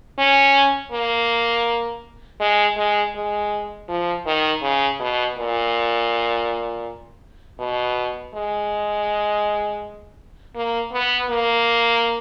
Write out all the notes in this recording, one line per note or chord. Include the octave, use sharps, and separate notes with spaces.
C#4
A#3
G#3
G#3
G#3
F3
D#3
C#3
B2
A#2
B2
G#3
A#3
B3
A#3